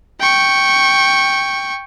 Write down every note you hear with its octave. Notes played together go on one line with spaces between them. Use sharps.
G5 C#6